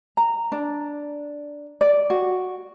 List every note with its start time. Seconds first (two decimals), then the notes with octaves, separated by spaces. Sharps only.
0.17 A#5
0.52 D4
1.81 D5
2.10 F#4